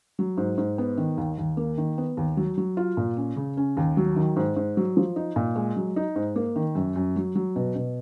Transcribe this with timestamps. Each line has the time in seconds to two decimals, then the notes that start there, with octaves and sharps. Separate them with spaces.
0.19 F#3
0.37 G#2
0.58 G#2
0.78 B3
0.98 D#3
1.17 D#2
1.38 D#2
1.57 A#3
1.78 D#3
1.98 B3
2.17 D#2
2.37 F#3
2.57 F#3
2.77 F4
2.97 A#2
3.17 C#4
3.36 C#3
3.57 C#4
3.77 D#2
3.97 F#3
4.16 D#3
4.36 G#2
4.56 G#2
4.77 F#3
4.97 F3
5.16 D#4
5.36 A#2
5.56 G#3
5.76 F#3
5.96 D#4
6.16 G#2
6.36 A#3
6.56 D#3
6.75 F#2
6.96 F#2
7.16 F#3
7.35 F#3
7.56 B2
7.75 B2